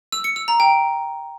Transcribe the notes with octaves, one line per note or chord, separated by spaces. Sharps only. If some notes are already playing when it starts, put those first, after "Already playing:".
E6
C#7
E6
A#5
G5